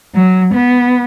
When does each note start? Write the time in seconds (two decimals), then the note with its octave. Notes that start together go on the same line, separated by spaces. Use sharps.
0.15 F#3
0.54 B3